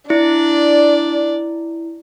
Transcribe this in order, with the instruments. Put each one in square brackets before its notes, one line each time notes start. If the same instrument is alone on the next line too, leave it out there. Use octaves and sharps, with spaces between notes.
[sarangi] D4 [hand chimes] E4 [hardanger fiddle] D5